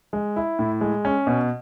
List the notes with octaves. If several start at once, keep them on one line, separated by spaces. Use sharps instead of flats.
G#3
E4
A2
G#3
C#4
B2